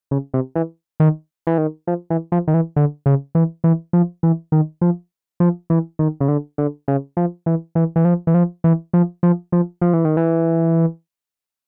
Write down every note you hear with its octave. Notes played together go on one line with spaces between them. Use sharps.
C#3
C3
E3
D#3
E3
D#3
F3
E3
F3
D#3
E3
D3
C#3
E3
E3
F3
E3
D#3
F3
F3
E3
D#3
C#3
D3
D3
C#3
F3
E3
E3
E3
F3
E3
F3
E3
F3
F3
F3
F3
E3
D#3
E3